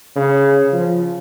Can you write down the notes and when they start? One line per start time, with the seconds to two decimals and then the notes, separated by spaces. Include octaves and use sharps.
0.16 C#3
0.72 F3